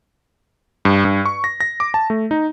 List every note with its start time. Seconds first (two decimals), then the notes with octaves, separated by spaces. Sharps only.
0.85 G2
1.05 G2
1.26 C#6
1.44 A#6
1.61 A#6
1.80 D6
1.94 A5
2.10 A3
2.31 D#4